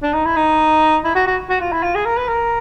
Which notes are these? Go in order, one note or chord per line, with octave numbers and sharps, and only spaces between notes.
D4
D#4
E4
D#4
E4
F#4
F#4
F#4
F4
E4
F4
G#4
A#4
B4
A#4